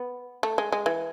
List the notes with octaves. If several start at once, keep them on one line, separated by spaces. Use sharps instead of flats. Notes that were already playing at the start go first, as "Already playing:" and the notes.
Already playing: B3
A3
G#3
G#3
E3